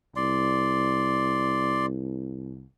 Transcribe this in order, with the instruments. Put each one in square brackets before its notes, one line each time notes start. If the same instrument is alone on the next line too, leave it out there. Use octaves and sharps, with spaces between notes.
[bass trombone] C2 [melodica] D5 C6